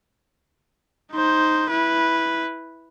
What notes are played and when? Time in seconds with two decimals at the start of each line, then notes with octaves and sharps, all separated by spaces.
1.12 D#4 C5
1.70 E4 B4